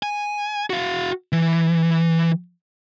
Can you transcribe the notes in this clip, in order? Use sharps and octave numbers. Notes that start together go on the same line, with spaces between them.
G#5
F#4 F5
E3